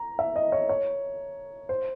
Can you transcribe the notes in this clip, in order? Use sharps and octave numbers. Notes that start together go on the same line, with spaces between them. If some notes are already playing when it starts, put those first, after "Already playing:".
Already playing: A#5
E5
D#5
C#5
C#5
C5